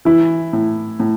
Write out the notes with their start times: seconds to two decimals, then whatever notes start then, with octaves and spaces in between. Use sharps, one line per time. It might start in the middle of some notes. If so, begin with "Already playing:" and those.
0.05 E3 E4
0.53 A2
1.00 A2